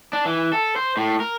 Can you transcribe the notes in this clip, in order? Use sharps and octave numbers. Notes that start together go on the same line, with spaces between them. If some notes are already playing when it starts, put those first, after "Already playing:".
D4
E3
A4
C5
A2
A#4